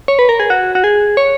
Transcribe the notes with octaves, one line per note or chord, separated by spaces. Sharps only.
C#5
B4
A#4
G#4
F#4
F#4
G#4
C#5